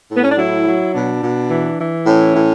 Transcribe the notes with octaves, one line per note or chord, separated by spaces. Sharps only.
A2
B3
C#4
D4
F#3 E4
F#3
B2 D4
B2
E3
E3
A2 C#4
A2